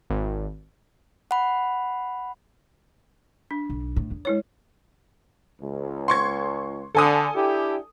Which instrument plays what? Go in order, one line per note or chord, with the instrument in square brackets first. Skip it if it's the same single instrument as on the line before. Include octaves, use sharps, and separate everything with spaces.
[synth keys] G#1
[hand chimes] F#5 B5
[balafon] D4
[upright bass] B1
A2
E2
[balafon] G#3 E4 C#5
[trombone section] C#2
[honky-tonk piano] C6 C#6 G#6
[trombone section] D3 [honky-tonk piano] A4 G#5 D#6
[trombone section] D4 E4 G4